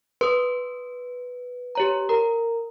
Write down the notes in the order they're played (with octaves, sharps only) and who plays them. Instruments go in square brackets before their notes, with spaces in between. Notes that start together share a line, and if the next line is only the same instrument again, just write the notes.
[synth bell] B4 [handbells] C6 D#6
[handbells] G4 C#5 A#5
A#4 A#5